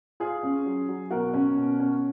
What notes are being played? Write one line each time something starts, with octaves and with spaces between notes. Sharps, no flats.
F4 G#4
C#4
F#3
F#3
B2 F#4 A#4
C#4
B2
C#4